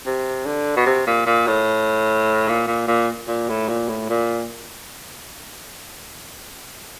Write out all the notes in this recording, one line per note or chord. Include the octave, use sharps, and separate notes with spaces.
C3
D3
B2
C3
A#2
A#2
A2
A#2
A#2
A#2
A#2
A2
A#2
A2
A#2